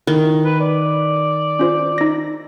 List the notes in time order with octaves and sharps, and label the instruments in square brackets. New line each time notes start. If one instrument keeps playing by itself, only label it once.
[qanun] D#3 [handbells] E4
[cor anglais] B4
D5
[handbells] C#4 F4 C5
D#4 A#6